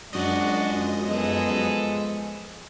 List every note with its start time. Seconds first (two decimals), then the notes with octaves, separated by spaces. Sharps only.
0.13 F#2 F3 G#3 D4 F#4 D#5
1.07 B3 G#4 A4